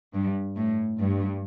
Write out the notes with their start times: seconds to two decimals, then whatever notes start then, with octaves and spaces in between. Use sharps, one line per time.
0.14 G2
0.57 A2
0.99 G2